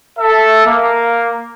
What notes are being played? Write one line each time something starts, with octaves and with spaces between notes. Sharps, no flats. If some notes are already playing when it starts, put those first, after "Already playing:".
A4 E5
A#3